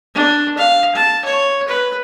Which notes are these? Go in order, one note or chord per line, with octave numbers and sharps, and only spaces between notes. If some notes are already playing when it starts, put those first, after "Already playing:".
D4
F5
A5
C#5
B4